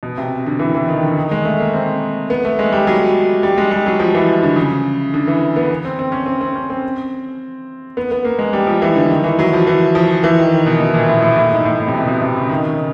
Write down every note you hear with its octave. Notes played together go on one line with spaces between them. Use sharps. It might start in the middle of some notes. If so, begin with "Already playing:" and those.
B2
C3
D3
E3
E3
D#3
D3
D#3
G#3
A3
A#3
C4
B3
A3
G#3
G3
F#3
G3
G#3
G3
F#3
F3
E3
D3
C#3
D3
E3
B3
C4
C4
C#4
C4
C4
C#4
C4
B3
B3
A#3
G#3
G3
F3
E3
D3
D#3
E3
F#3
F3
E3
F3
E3
D#3
D#3
B2
B2
A#2
A2
A2
A2
G#2
A2
A2
C3
B2
B2
C3
C#3
D#3
C#3